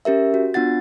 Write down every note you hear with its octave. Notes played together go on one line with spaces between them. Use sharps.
C#4 G4 A#4 E5
F#4
B3 D4 F4 F#5 A6